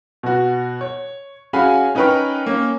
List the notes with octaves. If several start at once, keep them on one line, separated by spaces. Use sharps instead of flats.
B2 F#4
C#5
C#4 F#4 G#4 F5 G#5 B5
C#4 D#4 A#4 B4 G5 C#6
A#3 C#4